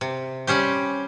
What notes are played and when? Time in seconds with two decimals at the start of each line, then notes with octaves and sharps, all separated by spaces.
0.01 C3
0.47 G3 C#4 G4 C5